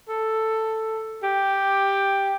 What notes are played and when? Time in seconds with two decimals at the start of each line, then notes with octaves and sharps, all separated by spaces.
0.08 A4
1.23 G4